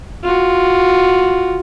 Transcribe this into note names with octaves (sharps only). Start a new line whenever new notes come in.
F4 F#4